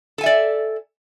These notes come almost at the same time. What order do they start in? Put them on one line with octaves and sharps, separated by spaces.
A4 G#5 E5 D5